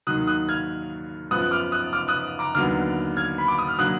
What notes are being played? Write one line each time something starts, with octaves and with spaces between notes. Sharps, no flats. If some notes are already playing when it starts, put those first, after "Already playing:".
D#2 D#3 F#3 D#6 F#6
D#6 F#6
F6 G#6
F#2 F3 B3 D#6 F#6
F#6
D6 F6
D#6 F#6
D6 F6
D#6 F#6
A#5 D6
D#2 D3 F#3 B3 D6 F6
F6 G#6
B5
D6
D#6
F6
D3 F#3 A#3 D#6 F#6